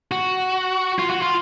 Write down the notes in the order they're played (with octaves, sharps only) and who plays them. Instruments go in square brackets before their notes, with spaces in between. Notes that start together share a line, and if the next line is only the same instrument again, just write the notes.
[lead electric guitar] F#4
F4
F#4
F4